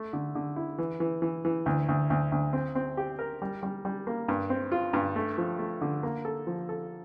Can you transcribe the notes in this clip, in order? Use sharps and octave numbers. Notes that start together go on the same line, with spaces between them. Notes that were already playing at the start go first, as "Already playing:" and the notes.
Already playing: A3
D3
D3
E4
E3
E3
E3
E3
D2
D2
D2
D2
C4
C4
G4
A#4
G3
G3
G3
A#3
G2
C4
F4
G2
A3
F3
A3
D3
A#3
A4
F3
A4